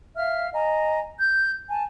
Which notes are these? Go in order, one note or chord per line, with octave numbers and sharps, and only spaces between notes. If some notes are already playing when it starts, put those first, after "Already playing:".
E5 F5 F6
D#5 G#5 A#5
G6
G#5 A5